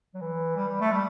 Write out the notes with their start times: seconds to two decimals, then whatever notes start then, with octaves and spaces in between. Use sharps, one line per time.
0.14 F#3
0.21 E3
0.56 G3
0.68 G3
0.81 A3
0.92 G3